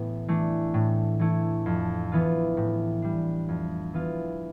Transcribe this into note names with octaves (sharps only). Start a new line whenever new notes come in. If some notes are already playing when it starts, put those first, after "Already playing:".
Already playing: A2 E3 B3
E3 A3 D4
A2
E3 A3 E4
F2
E3 B3 F4
A2
G3 D4
F2
E3 B3 F4